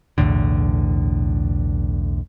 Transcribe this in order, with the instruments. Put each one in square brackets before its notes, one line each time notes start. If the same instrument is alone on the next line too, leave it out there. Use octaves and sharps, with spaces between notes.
[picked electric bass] B1 E2 A2 D3